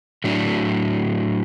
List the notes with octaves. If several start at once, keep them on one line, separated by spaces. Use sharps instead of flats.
A2 F#3 A3 D4